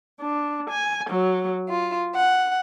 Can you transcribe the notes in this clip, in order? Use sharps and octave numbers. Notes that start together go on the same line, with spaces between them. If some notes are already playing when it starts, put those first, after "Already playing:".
D4
G#5
F#3
F4
F#5